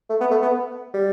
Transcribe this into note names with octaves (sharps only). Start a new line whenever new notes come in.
A3
B3
A3
B3
G3